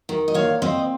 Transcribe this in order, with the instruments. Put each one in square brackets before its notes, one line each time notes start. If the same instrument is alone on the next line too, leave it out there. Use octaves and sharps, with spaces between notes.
[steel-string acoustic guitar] D#3
D#5
A#2 C#5 F5
C4 C5 D#5